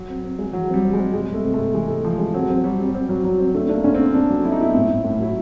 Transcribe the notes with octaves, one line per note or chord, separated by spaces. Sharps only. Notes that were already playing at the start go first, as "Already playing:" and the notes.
Already playing: F#3
C4
C4
G#3
E3 F#3
G3 C4
C4
G#3
C4
C3 G#3
C3
A3
C3
C3 A3
E3 G#3
C3 A3
E3 F3
G#3
F#3 C4
C4
F#3 G3
C4
C4
F#3
F#3
C4
D3 A3
A#3 D4
D3 C#4
D3 C4
D3 D4
F#3
F#3 E4
D#4
B3 E4
A2
A2
A2
F#3 E4